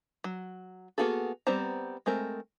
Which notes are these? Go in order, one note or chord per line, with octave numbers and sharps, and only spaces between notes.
F#3
A#3 B3 F#4 G#4 A4
G3 B3 C4 C5 A#5
G#3 A3 C4 A#4